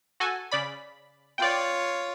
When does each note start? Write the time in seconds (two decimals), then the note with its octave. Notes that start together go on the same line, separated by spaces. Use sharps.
0.20 F#4 A4 G#5
0.51 C#3 D5 B5
1.38 F4 C#5 D5 G5